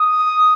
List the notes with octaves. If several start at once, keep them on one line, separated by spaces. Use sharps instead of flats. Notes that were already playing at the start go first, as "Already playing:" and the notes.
Already playing: D#6